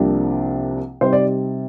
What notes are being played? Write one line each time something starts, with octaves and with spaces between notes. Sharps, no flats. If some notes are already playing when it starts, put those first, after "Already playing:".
Already playing: C2 C3 F3 A#3 D4
C3 G3 C4 D#4 C5
D5